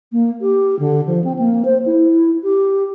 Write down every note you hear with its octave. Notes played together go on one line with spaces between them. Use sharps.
A#3
G4
D3
F3
C4
A#3
C5
E4
G4